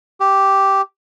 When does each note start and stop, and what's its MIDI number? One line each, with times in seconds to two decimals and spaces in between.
0.20 0.82 67